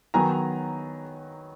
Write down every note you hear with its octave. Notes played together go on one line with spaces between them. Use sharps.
D#3 F#3 B3 G#5 A#5